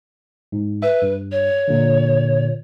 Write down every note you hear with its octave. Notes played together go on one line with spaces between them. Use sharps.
G#2
B4 E5
G2
C#5
A#2 D3